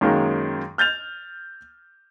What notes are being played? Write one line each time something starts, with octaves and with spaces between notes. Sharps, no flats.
F#2 D#3 G#3 A#3
F6 G6 A6 F7